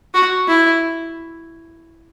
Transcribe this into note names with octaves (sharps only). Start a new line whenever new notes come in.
F#4
E4